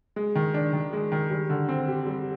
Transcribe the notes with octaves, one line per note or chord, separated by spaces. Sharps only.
G#3
D#3
D4
D#3
G#3
D#3
G3
D3
C4
G4
G3